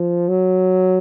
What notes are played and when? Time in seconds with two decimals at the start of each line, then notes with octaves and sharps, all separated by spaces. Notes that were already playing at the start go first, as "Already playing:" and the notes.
Already playing: F3
0.28 F#3